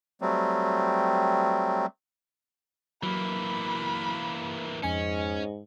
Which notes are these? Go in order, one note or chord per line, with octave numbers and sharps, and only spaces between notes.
F#3 G3 A3 C4
E3 F#3 A#3 B5
F2 G#2 C#4 D#5 G#5 C#7